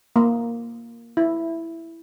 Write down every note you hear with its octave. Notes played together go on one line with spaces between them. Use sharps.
A#3
E4